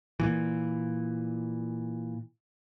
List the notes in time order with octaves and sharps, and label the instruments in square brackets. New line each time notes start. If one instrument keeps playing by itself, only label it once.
[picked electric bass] A#2 E3